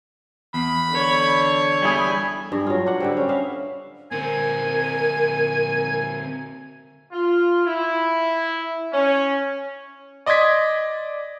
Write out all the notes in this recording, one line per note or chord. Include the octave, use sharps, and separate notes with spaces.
E2 B5
D3 C#5
G3 E4 G#4 G#5
G2 G#4
F#3 F4
D4 F#5
D3 G3 C4
C#4
B3 E5 F5
D3 C4 A#4 G#5
F4
E4
C#4
D5 D#5 C6 D6 G#6 B6